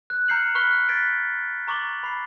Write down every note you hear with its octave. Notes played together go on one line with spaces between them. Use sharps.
F#6
A#5 F6 G6 C7 C#7 F#7
B5 C#6 F6 F#6 B6 G7
F#6 G#6 A6 B6 D7
A#5 C#6 D6 A6 F#7 G7
B5 C7